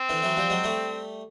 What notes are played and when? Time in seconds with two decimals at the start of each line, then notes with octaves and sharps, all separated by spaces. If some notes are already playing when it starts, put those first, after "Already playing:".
Already playing: C4
0.09 D3 E3
0.22 E3 F#3
0.37 F3 G3
0.50 F#3 G#3
0.64 G3 A3